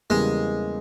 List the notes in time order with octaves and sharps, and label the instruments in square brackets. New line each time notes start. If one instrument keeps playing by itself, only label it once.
[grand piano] E2 C#3 G3 A#3 [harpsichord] G#3